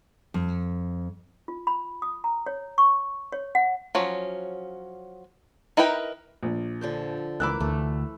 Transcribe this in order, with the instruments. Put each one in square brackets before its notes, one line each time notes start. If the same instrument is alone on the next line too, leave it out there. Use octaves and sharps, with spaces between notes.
[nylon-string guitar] F2
[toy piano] F4
B5
D#6
A#5
C#5
C#6
C#5
F#5
[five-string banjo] F3 F#3 C#4
D#4 E4 A#4 B4 G5
[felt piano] A#1
[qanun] D3 F3 C5
[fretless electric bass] C#2 [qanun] E3 A#3 D6 [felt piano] B5 E6 F#6
[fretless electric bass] D2 [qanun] A3